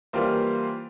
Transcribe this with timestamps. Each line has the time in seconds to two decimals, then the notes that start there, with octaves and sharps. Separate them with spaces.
0.13 E3 G3 A#3 F4 C5